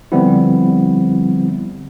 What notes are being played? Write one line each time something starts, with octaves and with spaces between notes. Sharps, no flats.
D3 F3 G3 B3 C4 E4